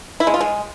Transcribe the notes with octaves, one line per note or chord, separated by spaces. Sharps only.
E4
G#3
F4
G#3